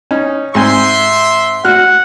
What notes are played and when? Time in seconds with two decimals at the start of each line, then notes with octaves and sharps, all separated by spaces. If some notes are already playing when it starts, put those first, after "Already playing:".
0.11 C#4 D#4
0.55 G#2 C4 E5 G#5 C6
1.65 F#4 F#5 F6 F#6